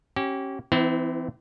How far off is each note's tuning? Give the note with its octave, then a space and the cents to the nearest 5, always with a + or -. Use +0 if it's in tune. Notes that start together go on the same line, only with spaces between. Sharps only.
C#4 -25 G4 -30
E3 +20 C4 -35 E4 -25